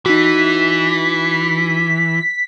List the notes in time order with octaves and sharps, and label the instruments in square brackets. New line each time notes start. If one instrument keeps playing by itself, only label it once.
[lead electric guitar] E3 [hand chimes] D#4 F#4 [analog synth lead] B6